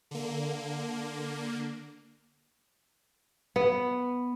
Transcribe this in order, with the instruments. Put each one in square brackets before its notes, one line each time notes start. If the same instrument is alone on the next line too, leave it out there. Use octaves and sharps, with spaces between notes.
[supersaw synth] D3 A#3
[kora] B3